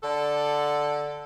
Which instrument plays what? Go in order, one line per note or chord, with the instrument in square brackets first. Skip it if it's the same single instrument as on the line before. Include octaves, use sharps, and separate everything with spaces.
[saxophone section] D3 A4 D5